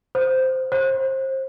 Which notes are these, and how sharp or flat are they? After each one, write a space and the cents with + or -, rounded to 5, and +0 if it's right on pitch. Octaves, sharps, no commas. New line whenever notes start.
C5 -10
C5 +25